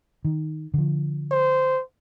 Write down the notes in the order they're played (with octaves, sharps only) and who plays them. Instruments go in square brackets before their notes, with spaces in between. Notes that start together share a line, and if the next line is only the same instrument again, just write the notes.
[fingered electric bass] D#3
D3 F3
[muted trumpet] C5